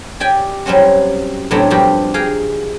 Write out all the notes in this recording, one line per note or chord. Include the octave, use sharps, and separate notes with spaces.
G4 D5 G5 G#5
F#3 G3 C4 C#4 F#4
A2 C3 F#3 B3 C4 D4
G2 F3 F#4 G4
G#4 F5 G5 A#5